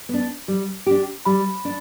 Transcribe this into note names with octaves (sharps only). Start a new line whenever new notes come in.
B3 D4
G3
D4 G4
G3 B5
D4